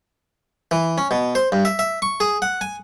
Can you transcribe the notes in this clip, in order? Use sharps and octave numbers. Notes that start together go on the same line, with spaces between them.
E3
C#4
B2
C5
G2
E5
E5
C#6
G#4
F#5
G#5